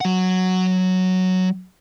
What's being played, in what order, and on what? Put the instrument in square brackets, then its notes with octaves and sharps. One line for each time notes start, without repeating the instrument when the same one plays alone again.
[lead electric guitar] F#3 F#5